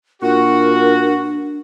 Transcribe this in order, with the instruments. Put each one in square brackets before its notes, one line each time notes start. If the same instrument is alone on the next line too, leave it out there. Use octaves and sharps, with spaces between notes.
[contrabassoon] A#2 [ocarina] D4 [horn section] F#4 [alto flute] A#4